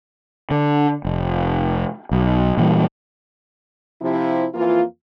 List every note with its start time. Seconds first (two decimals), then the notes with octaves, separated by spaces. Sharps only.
0.51 D3
1.05 F1
2.11 B1
2.57 A#2 E3 G3
4.01 C3 F3 E4
4.54 F2 E3 A#3 F4